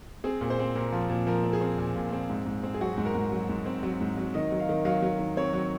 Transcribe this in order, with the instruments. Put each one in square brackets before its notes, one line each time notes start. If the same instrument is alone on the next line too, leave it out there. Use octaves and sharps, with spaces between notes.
[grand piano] C4 G#4
A#2
C5
C4
A#2 A#4
F3
A#2
F3 A#4
C4
G#4
C4
A#2
A#2
C4
G#2
G#2
C4
G#4
F#3 F#4
G#2
A#4
G#2
F#3
G#2
C4
F#3
G#2
F#3
D#3 D#5
F#3
F5
D#3
F#3 F5
F#3
D#3
C4 C#5
F#3